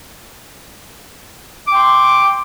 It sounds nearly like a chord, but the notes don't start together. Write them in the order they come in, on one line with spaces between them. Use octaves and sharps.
D6 G5 C6